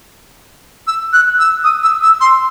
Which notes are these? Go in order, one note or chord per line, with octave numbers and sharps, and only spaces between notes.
E6
F#6
E6
D#6
E6
E6
C6